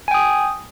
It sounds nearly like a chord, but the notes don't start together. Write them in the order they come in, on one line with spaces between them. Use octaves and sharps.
G#5 G5 D#6